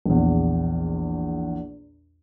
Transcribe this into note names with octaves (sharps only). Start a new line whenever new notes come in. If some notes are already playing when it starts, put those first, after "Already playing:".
A#1 E2